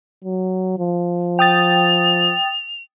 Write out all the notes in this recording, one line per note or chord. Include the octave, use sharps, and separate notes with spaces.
F#3
F3
G5 D#6 A6 F7